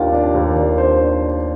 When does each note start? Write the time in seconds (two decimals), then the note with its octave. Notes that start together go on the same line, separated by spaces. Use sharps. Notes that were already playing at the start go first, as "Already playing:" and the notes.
Already playing: D#2 D#3 D4 F4 G4
0.13 D4
0.34 D#2
0.56 D#2
0.78 D4 C5
0.99 D4